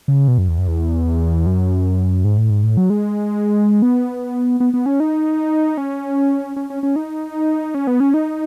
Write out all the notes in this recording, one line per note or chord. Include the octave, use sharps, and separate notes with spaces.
C#3
B2
F#2
E2
F#2
E2
F#2
G#2
A2
G#2
A2
F#3
G#3
B3
B3
B3
C#4
D#4
C#4
C#4
C#4
C#4
D#4
C#4
B3
C#4
D#4